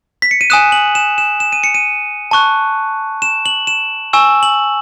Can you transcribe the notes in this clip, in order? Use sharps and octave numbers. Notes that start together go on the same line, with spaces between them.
B6
C#7
D#7
G#5 D#6 F#6 E7
F#7
E7
E7
E7
D#7
C#7
D#7
A5 C#6 F#6
E7
F#7
E7
G#5 C#6 E6 E7
F#7